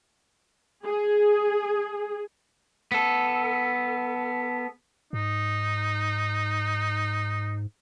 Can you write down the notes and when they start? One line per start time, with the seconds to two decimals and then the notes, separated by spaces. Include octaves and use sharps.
0.86 G#4
2.92 B3 A4
5.13 G#2 D#4